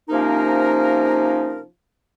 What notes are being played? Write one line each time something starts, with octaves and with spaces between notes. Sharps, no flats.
C3 F3 A#3 C#4 D#4 A#4